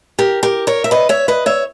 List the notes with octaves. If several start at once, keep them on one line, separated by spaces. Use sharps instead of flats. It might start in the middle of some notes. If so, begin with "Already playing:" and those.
G4 A#4
G4 A#4
A#4 C#5
E5
B4 D#5
C#5 E5
B4 D#5
C#5 E5